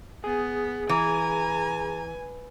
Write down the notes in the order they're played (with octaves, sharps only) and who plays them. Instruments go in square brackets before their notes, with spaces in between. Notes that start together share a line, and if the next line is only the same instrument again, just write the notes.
[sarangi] B3 [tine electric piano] G#4
[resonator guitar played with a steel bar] E3 [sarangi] G#5 [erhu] A#5